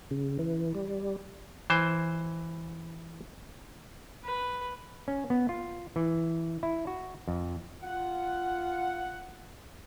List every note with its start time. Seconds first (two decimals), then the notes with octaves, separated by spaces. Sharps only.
0.11 C#3
0.39 E3
0.75 G3
1.70 E3 C5
4.25 B4
5.08 C#4
5.30 B3
5.49 F4
5.96 E3
6.63 E4
6.87 F#4
7.28 F2
7.83 F4 F#5